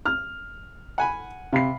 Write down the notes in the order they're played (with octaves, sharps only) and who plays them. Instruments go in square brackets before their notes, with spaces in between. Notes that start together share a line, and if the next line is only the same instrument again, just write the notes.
[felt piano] F6
[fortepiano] F#5 G#5 B5
[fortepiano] C3 [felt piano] F5 B5 C7